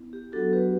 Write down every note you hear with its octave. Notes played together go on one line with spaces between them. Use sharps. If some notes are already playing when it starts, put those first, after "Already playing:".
Already playing: B3 E4
G4
F#3 B3 D4 F#4 A4
G4 B4